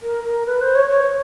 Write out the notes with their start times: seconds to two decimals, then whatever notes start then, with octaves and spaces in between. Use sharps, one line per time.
0.02 A#4
0.24 A#4
0.46 B4
0.61 C5
0.75 C#5
0.89 C#5